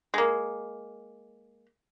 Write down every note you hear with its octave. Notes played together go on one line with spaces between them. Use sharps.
G#3 A#3